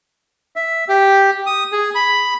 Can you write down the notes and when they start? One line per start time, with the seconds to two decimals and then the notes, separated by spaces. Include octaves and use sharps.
0.56 E5
0.89 G4
1.46 D#6
1.72 G#4
1.95 B5